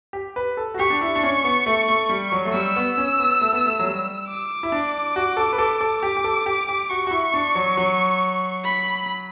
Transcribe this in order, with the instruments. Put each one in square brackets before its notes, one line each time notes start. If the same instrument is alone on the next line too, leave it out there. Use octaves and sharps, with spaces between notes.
[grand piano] G4
B4
A4
F#4
[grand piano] G4 [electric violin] C#6
[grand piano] D4
E4
D4
C#4
B3
A3
A3
G3
F#3
A3
[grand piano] G3 [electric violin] E6
[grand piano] B3
C#4
B3
A3
B3
A3
F#3
G3
[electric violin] D6
[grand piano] E4
D4
F#4
A4
B4
A4
A4
[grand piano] G4 [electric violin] D6
[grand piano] G4
A4
G4
G4
[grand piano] F#4 [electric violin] C#6
[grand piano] F#4
E4
D4
F#3
F#3
[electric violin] B5